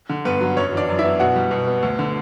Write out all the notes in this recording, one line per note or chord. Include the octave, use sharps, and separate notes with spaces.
D3
G2 B3 B4
F#3
F#2 C#4 C#5
E3 D4 D5
F#2
E4 E5
B3
B2 F#4 F#5
G3
B2
B3
D2
D3